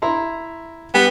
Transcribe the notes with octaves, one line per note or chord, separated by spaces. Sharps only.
E4 A#5 C6
G3 B3